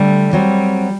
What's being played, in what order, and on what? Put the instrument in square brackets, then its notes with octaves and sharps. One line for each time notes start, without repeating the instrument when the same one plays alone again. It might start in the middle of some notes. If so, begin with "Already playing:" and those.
Already playing: [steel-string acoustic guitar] D3 A3 D4 [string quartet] G3
[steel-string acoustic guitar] F#3 C4 F#4 [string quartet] G3